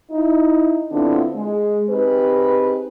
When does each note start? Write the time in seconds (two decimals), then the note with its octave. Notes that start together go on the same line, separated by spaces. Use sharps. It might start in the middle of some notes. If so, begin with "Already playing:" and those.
0.11 D#4 E4
0.92 D3 B3 C4 D4 E4 F4
1.35 G#3
1.89 C4 D#4 G4 G#4 B4